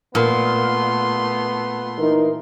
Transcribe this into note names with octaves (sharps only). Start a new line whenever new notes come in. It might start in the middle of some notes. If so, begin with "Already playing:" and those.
A#2 A3 B3 C6
E3 D#4 A#4